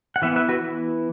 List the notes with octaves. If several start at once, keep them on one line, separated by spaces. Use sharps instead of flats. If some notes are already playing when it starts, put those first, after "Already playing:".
F#5
E3 B3 B4 E5
B4 E5
F#4 B4